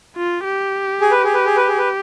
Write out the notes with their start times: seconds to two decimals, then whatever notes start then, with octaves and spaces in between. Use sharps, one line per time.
0.16 F4
0.44 G4
1.01 G#4
1.12 B4
1.24 G#4
1.34 B4
1.45 G#4
1.57 B4
1.68 G#4
1.78 B4